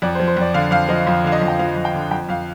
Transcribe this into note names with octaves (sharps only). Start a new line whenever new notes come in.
F2 D5
C5
F3
C5
F2 D5
D3 F5
F2 F5
F3 D#5
F2 F4
D3 F5
D#5
F2
G5
F3 F5
F2
G5
D3
F2 G5
F2 F5